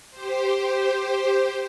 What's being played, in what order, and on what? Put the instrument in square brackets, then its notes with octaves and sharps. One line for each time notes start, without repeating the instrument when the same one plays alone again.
[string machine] G4 C5